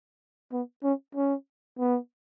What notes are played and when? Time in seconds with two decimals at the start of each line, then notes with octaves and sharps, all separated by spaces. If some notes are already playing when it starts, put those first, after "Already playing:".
0.52 B3
0.83 C#4
1.15 C#4
1.79 B3